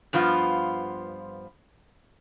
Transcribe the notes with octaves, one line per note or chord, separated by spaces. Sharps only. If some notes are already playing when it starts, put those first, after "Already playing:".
G2 F3 B3 F4